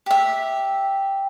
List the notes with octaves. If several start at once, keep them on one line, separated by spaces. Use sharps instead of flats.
G4 E5